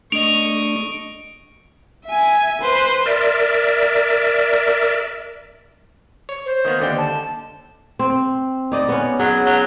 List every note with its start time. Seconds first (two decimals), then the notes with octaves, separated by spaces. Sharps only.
0.12 A3 D4 D#5 C#6 D7 F7
2.06 E5 G#5
2.61 B4 C5
3.06 A#4 D5 E5
6.29 C#5
6.46 C5
6.65 D#3 A#3 B3
6.79 D#2 D3 G5
6.98 A5
7.99 C4
8.72 D#4 D5 D#5
8.89 B3 C#4
9.19 F#3 G#4
9.46 F#3